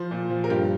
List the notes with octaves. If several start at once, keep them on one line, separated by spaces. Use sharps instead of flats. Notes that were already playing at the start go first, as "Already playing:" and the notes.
Already playing: F3 C5
A#2
F3
A#4
G2 G4